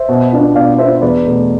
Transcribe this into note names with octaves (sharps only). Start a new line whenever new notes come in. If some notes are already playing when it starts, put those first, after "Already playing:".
Already playing: C5 E5
B2
B3 D4 F4
B2 D5 F5
B3 D4 F4 C5 E5
E2 B4 D5
B2 A3